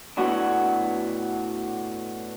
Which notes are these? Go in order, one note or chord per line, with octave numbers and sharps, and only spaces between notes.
A2 F#3 B3 D4 F#4